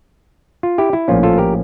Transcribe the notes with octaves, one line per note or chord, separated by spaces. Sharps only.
F4
E4 G4
E4
A#1 A2 F3 A#3 C#4 F4
F4 A4
G4 A#4